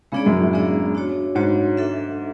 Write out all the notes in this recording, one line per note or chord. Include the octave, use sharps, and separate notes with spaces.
C#3 G#3 B3 D4 G#4 D5
F#2
A2
G#3 B3 D4 G#4 D5
D4 F#4 C#5
G#2 D4 F#4 C#5
D4 A4 E5